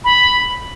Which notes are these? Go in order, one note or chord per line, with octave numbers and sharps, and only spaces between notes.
B5